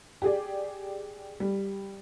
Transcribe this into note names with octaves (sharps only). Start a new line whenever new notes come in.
G4 G#4 D5
G3